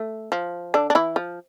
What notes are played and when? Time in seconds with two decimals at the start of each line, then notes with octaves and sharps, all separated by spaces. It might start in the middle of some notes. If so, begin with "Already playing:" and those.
Already playing: A3
0.32 F3
0.74 D3 D4
0.90 D4
0.95 E3 E4
1.16 F3